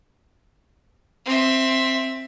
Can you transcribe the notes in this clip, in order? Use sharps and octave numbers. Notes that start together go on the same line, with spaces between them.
C4 E5